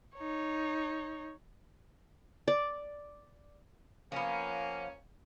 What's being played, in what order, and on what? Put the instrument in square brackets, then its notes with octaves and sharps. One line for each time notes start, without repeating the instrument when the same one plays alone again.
[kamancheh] D#4 C#5
[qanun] D5
[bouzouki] F3 B3 [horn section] A#3 C#4